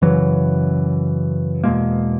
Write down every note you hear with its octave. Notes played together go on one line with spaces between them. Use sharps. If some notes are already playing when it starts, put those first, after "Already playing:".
F#2 C#3 E3 F#3
E2 B2 G#3 A#3